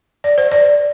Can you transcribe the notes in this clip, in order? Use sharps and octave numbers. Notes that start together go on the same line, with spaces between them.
D5
C5
D5